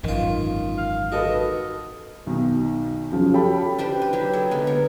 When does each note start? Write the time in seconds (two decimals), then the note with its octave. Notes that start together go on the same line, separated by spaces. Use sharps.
0.04 G#1 F#2 D#3 E3 F4
0.78 F5
1.12 D#3 F#4 A4 B4 D#5
2.26 B1 D#3
3.10 F#2 C#3 F3 F#3
3.34 C#4 G4 A4 G5 A5 B5
3.79 D4 G4 B4 C5
4.02 B4
4.13 F#3 G4
4.33 G#4 A4
4.51 D3 G#3 B3
4.67 A#4 C#5